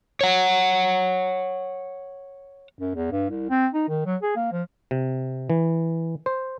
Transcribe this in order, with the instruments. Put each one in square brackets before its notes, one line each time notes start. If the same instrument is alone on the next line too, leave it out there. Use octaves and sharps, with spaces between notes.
[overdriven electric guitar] C#5 F#5
[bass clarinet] F#2
E2
G2
C2
C4
D#4
D#3
F#3
G#4
A#3
F3
[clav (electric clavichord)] C3
E3
C5